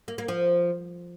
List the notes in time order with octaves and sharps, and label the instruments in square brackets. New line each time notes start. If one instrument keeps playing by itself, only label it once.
[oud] A#3
A#3
F3